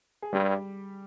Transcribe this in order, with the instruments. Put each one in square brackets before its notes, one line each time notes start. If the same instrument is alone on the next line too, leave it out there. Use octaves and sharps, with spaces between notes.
[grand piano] G#4
[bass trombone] G2 [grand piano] G3 G4